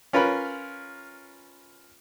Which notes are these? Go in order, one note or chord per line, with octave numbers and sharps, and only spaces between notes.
C#4 F4 A#4 B4 B5